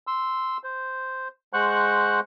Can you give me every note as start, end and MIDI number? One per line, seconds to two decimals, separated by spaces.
0.07 0.57 84
0.07 0.57 88
0.64 1.28 72
1.53 2.20 56
1.53 2.20 72
1.53 2.20 78
1.53 2.20 85
1.53 2.20 90